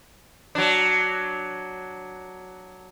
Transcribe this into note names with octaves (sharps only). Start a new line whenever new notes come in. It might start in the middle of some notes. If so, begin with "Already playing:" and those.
F#3 D4